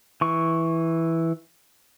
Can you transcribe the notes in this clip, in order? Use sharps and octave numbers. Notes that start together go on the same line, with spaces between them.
E3 C#6